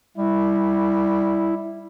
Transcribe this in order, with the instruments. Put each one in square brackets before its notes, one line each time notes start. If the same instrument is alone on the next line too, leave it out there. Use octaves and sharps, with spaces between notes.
[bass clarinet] G3 [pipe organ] E4